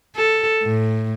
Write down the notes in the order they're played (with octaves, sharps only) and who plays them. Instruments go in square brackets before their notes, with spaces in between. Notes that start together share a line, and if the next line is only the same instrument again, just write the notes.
[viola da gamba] A4
A2